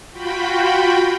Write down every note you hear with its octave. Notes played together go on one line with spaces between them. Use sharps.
F4 F#4 G5 B5